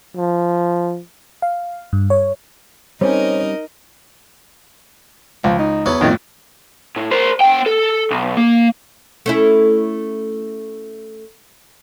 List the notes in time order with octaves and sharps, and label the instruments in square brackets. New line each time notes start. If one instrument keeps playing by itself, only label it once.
[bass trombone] F3
[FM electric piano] F5
G2
C#5
[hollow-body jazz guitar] G3 C4 C#4 [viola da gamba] D#4 A#4 D#5 [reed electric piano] C5 C#5
[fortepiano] C#2 [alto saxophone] F3
[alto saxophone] D#4
[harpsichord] E2 F#3 B3
[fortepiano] F2 A2 [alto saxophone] D#3
[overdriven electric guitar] A2
A#4 C5
B3 G5
A4
B1
A#3
[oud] A3 C#4 E4